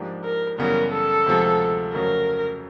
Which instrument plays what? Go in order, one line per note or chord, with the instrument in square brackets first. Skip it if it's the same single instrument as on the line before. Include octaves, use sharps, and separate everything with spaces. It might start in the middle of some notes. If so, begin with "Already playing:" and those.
Already playing: [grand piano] G#2 F3 A#3 D4 G4
[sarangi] A#4
[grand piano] F#2 C#3 E3 G3 B3 [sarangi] A#4
[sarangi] A4
[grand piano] D2 C3 F3 G#3
[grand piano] F2 C#3 F#3 A3 [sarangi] A#4